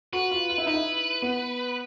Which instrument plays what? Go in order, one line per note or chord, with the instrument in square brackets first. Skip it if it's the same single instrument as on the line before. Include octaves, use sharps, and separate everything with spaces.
[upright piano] F#4 [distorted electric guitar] B4
[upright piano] F4
F4
E4
[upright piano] D#4 [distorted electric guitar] B4
[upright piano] E4
B3